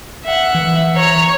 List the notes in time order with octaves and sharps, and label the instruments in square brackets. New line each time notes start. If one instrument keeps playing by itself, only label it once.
[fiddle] E5 F#5
[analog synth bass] E3
[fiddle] C#5 A#5